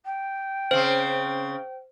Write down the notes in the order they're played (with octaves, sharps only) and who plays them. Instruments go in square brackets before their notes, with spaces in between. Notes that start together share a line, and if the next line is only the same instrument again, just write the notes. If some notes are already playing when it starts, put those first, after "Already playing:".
[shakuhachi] G5
[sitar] C#3 C4 [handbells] C5